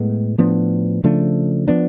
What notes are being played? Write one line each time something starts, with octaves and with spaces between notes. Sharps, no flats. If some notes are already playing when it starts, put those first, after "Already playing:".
Already playing: A2 G#3 B3
A2 F3 B3 D4
C#3 F3 A3 D4
F3 B3 D4